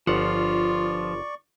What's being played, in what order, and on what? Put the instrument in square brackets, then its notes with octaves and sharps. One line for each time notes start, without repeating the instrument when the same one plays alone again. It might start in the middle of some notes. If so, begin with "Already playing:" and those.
[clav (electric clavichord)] G1 F#5 [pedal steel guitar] F3 [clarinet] F4 [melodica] D5 C#6